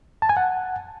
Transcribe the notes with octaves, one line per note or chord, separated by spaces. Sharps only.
A5
G#5
F#5